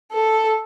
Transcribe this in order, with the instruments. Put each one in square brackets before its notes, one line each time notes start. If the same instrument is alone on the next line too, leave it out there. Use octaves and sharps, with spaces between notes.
[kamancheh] A4